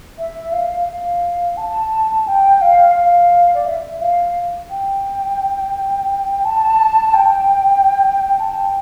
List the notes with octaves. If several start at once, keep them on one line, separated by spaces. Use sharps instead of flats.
E5
F5
F5
A5
G5
F5
F5
D5
E5
F5
G5
A5
G5
A5
G5